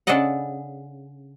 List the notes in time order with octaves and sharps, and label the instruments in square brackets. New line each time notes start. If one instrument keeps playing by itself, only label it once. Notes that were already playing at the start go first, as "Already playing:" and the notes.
[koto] C#3 D4 A4 D5 D#5 F#5